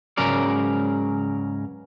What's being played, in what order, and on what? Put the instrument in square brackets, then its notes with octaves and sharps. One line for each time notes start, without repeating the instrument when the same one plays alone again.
[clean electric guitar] C#2 G#2 C#3 F#3 A#4 D5